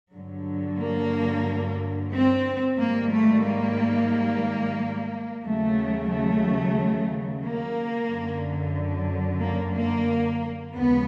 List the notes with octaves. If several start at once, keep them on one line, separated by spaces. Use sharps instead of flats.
G2 D3 F#3
A#3
C4
G#2 D#3 G3 A#3
A3
A#3
D#2 C#3 F#3 A3
A3
A#3
F#2 D3 F#3
A#3
A#3
D#2 C#3 F3 G#3 B3